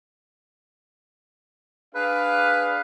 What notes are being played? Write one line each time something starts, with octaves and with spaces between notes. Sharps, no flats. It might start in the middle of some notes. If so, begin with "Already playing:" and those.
D4 G#4 B4 F5